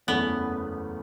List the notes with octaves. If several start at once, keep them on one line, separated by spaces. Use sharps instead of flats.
F#1 E2 E3 A3 B3 C#4